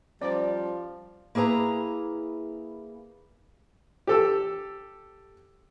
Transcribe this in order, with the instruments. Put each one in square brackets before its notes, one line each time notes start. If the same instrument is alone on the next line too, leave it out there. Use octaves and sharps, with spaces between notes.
[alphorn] F3 [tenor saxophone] G3 [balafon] C#4 C5 A#5 [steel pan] D5
[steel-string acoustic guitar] A#3 E4 G#4 B4 A#5
[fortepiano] G4 A4 E6